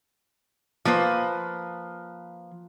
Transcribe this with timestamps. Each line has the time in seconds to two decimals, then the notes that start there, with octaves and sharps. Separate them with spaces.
0.85 F3 A#3 B4 C5